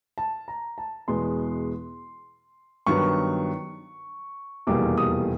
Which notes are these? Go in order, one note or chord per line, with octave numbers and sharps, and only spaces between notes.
A5
A#5
A5
E2 B2 G#3 B3 C6
G2 D#3 F#3 B3 C#6
F1 E2 B2 G3 A#3 D6
D#6